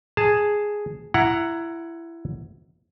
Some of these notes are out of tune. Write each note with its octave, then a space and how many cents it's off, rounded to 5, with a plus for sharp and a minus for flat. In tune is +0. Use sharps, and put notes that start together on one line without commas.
G#4 +0 A5 +10
E4 +20 F#5 +0 A#5 +0